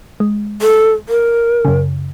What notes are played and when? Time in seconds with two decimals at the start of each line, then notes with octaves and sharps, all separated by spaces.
0.20 G#3
0.62 A4
1.09 A#4
1.65 F#2 C#3